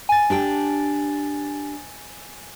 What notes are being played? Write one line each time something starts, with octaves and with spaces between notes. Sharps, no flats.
G#5 A6
D4 G4 G5